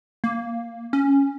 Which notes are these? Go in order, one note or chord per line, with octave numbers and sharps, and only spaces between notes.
A#3
C#4